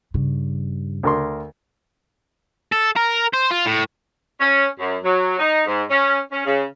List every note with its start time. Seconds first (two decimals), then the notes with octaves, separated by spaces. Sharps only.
0.14 G2 C#3
1.03 D2 A#4 C6
2.72 A4
2.96 A#4
3.33 C5
3.51 F4
3.66 A2
4.40 C#4
4.79 F#2
5.04 F#3
5.39 D#4
5.67 G#2
5.90 C#4
6.32 C#4
6.45 C#3